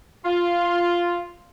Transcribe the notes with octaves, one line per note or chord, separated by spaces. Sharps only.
F4